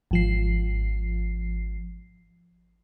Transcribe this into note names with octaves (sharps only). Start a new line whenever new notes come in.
G#1 F3 C7